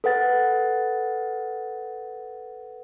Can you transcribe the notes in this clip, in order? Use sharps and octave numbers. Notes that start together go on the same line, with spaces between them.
A4 B4 F#5 A6